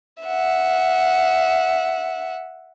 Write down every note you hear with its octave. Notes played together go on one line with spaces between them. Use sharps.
E5 F#5